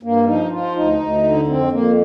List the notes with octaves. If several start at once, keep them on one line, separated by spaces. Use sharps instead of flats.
G2 A#3
F3 D#4
F3 F4
D2 D#4
D2
D3
F2 C4
F2 A#3